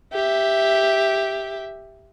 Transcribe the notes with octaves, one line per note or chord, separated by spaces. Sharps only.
G4 E5